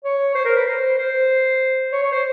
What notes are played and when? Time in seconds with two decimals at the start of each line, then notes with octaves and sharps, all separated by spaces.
0.04 C#5
0.35 C5
0.45 A#4
0.56 B4
0.67 C5
0.98 C5
1.92 C#5
2.03 C#5
2.12 C5